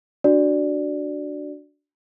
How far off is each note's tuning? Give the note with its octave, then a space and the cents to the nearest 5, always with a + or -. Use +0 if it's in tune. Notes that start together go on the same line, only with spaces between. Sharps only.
D4 +0 F#4 +0 D5 +0